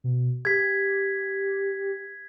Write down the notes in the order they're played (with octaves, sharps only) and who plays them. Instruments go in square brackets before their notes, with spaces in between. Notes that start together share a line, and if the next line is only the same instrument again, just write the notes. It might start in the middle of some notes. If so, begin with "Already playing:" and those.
[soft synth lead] B2
[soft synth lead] G4 [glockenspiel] G#6 B6